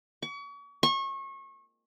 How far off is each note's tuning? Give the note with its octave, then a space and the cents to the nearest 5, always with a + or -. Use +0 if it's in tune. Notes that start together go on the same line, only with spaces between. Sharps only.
C#6 +40
C#6 -30